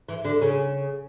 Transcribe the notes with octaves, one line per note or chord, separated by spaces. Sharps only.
E3
D3
C#3